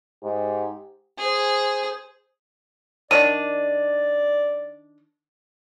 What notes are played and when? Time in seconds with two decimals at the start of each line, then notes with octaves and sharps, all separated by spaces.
0.23 G#2 G4
1.18 G#4 C5
3.11 D#3 D4 D5 D#7